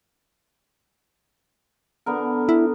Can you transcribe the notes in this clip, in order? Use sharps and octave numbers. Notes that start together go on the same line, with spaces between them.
D3 B3 A#4
E4